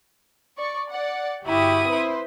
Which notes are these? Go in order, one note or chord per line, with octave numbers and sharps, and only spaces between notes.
D5 C#6
D5 F#5
G1 E4 F#4 G4 D#6
C4 B4 C5